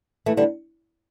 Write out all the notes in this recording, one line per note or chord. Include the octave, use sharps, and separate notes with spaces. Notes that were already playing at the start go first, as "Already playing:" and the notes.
E3 A3
D3 G3